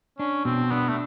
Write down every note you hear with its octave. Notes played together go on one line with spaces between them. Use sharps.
C#4 D4
B2 C4
B3 D4
A3